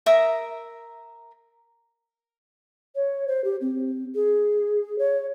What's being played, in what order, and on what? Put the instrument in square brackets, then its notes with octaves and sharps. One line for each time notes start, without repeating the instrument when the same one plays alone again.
[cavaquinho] A#4 E5 A#5 D#6
[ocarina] C#5
C5
G4
C4
G#4
C#5